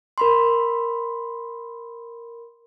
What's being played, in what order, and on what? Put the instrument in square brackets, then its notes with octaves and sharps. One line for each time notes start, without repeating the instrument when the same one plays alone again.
[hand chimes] A#4 B5 C6